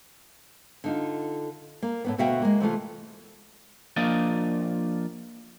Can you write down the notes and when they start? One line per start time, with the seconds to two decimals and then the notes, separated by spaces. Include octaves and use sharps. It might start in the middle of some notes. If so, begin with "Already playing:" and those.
0.84 D3 D#4 F4
1.83 A#3
2.04 A2 D#3 B3
2.18 D2 B2 F#4 E5 F5 G5
2.42 G#3 A#3
2.60 C3 E3 A3 F4
3.96 F3 A#3 D4 F4 D5 D#5